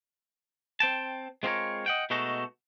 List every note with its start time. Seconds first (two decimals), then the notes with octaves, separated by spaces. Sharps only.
0.80 C4 G5 A5
1.43 G#3 C4 F4 G4 A#4 C#5
1.86 D#5 F#5 G5
2.10 B2 G#3 A3 D#4 F#4 A4